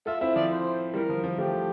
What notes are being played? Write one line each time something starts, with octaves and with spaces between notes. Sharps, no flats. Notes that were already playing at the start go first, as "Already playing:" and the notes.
F4 A4 E5
C4 E4 E5
F3 D5
C5
E3 G3 A#4
F3
F3
F3 A3 G4